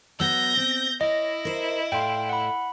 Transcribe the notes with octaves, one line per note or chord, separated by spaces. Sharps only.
F#3 B3 E6 G6 A#6
C4
E4 C#5 D#5
A#4 C5
A2 D5 F5 G5 C6
F#5 B5